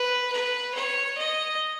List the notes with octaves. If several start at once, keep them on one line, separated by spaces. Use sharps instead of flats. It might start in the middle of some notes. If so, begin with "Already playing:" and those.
Already playing: B4
B4
C#5
D#5